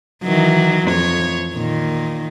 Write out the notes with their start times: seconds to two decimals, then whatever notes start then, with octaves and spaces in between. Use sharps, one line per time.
0.23 D#3 E3 F#3
0.86 F2 C#5
1.53 A#2 D#3